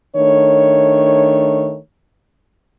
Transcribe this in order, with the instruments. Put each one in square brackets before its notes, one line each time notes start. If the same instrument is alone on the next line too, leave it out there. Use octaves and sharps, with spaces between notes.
[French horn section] D#3 A3 D4 C#5